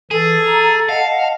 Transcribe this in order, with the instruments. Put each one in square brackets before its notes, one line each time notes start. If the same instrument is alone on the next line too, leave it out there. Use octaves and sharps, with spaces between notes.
[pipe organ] E3 [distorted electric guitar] G#4 [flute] A4
[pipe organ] A#5
[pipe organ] D#5 F#5 A5 [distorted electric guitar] F5